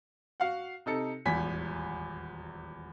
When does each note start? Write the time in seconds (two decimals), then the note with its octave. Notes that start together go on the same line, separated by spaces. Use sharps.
0.40 F#4 F5 F#5
0.86 C3 D#4 A4 C#7
1.25 D#1 G#1 E2 G#5 B6